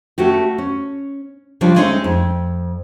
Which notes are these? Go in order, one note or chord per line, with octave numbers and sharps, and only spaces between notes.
A3 C#4 F#4 G4
C#4
C#3 F3 G3 C#4 D4
G#3 A3 C4 C#4 D#4
F2